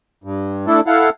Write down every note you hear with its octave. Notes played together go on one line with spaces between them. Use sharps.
G2
A3 D4 E4 A4
E4 A4 F5 F#5